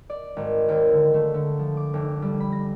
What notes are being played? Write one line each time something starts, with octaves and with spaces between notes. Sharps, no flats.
D5
G#1
D#2
D3
A3
D3
F3
D6
F1
G3
B5
A#6